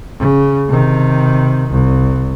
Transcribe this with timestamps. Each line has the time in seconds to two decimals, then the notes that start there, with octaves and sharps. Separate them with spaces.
0.19 C#3
0.68 C3 D#3
1.71 C2